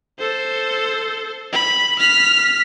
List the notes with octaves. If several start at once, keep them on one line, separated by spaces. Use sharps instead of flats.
A4 C5
B5
F6 B6